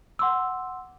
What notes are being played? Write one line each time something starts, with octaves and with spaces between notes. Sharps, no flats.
F#5 C6 D6 E6